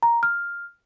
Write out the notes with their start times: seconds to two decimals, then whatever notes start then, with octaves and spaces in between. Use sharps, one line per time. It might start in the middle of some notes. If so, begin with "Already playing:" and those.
0.03 A#5
0.23 F6